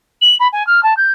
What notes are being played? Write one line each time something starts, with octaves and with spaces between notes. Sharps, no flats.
F#7
B5
G#5
F6
A5
G6